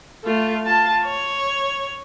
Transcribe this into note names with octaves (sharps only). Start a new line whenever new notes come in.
A3 F4
F4 A5
C#5